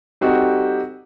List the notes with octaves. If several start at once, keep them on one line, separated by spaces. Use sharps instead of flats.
G3 C4 D#4 F#4 G4 A4